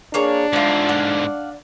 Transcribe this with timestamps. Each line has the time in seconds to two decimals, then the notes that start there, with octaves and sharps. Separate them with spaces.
0.14 A#3 D4 G#4 C#5
0.53 G#2 D3 A3 F4
0.89 D5 F5 F#5